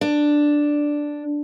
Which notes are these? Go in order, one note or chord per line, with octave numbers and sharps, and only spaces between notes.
D4